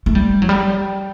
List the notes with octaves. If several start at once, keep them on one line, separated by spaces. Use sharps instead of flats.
A3
G3
F#3
G3